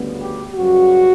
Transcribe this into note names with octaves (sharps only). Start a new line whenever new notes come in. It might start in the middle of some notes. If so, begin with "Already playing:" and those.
Already playing: D2 C#3 G3 B3
G4
F#2 C#3 G3 B3 F#4